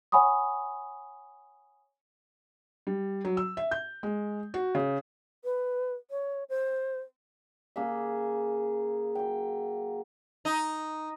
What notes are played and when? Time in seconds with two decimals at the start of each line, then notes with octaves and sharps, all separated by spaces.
0.12 C#5 F#5 G#5 B5 C#6 D#6
2.87 G3
3.25 F#3
3.37 E6
3.57 E5
3.71 G6
4.03 G#3
4.54 F#4
4.75 C#3
5.44 B4
6.11 C#5
6.49 C5
7.76 C#3 A#3 G#4 E5
9.15 F#3 G5
10.45 D#4